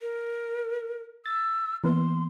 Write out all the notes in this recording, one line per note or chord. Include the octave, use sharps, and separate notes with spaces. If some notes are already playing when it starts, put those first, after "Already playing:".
A#4
E6 A6
E3 A#3 B3 C6